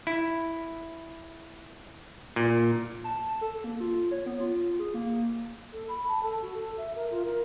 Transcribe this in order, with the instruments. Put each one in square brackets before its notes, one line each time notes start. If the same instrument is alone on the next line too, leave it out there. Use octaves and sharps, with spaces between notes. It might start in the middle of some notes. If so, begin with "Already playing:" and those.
[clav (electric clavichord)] E4
A#2
[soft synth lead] A5
A4
A#3
F4
C#5
B3
F4
G#4
A#3
[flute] A4
B5
A5
A4
F#4
A4
E5
A#4
F4
A#4